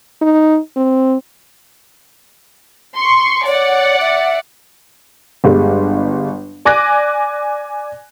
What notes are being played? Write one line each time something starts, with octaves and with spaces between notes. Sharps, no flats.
D#4
C4
C6 C#6
C#5 D5 F#5
E5
G1 G3 G#3
D5 G#5 D6 F#6 G#6 A#6